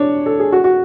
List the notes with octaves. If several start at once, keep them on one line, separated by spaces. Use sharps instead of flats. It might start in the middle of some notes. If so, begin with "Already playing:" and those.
Already playing: D4 C#5
A4
G#4
F#4
F#4